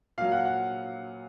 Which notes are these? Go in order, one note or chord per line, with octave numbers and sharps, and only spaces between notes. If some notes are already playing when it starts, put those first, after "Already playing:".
A#2 F#3 F5
F#5
F#5